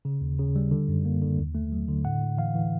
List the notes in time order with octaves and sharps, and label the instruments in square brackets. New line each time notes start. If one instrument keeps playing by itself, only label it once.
[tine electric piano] C#3
D#2
C#3
G3
D3
F#2
A#3
D3
D#2
A3
F#3
D3
A2 F#5
A2
E3 F5
E3